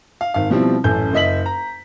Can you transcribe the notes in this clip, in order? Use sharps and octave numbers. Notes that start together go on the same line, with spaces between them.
F5
G#1 F5
B2 F3 G3 C4 E4
A1 F#2 A4 G6
F#1 D#5 E5 B6 F#7
A#5